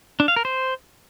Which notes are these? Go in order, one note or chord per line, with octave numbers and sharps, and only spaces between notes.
D4
F5
A#4
C5